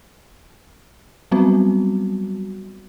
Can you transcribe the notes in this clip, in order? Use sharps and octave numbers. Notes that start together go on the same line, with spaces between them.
F#3 G3 B3 C4 F#4